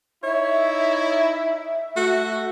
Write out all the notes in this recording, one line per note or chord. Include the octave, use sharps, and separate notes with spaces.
D#4 E4 C#5 E5
A3 F#4